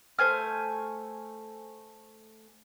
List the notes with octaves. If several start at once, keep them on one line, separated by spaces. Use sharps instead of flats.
A3 C5 G#5 F6